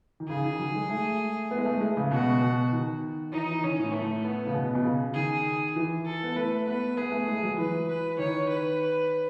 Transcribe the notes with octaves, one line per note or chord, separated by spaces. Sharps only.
D#3
C#3 G#4
D#3
F#3
G#3
A3
B3
G#3
A3
G#3
C#3
B2 F#4
B2
D#3
E3 D#4
E3
D#3 C#4
A2
A3
A2
B3
C#3
B2
B2
C#3
D#3 G#4
E3
A4
B3
A3 B4
B3 B4
B3 G#4
A3
G#3
F#3
E3 B4
B4
D#3 C#5
B4